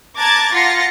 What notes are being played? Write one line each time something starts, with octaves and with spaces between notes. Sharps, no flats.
A5 A#5 D6 F#6 G#6 A6
F4 F#5 C6 A6 A#6 C#7